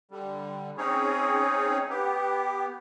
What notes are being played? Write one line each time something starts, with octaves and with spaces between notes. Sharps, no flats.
D3 G3
C4 C#4 D#4 G#4 C#5
B3 G4